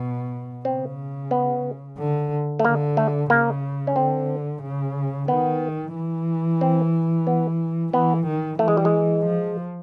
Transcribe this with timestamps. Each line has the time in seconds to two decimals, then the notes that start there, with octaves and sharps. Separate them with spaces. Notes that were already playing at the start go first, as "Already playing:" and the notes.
Already playing: B2
0.65 C#3 C4
1.31 B3
1.98 D3
2.59 A3
2.64 D3 A#3
2.97 A3
3.30 C#3 A#3
3.87 C#4
3.96 D3 C4
4.63 C#3
5.28 D#3 B3
5.95 E3
6.61 C4
7.27 B3
7.93 E3 B3
8.27 D#3
8.59 E3 A3
8.68 G#3
8.77 G3
8.85 G#3
9.26 F3